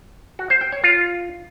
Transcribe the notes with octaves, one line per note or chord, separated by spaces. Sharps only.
F#4
C5
G5
C#5
F4